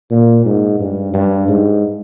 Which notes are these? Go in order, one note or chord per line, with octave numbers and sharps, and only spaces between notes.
A#2
G#2
G2
G2
G#2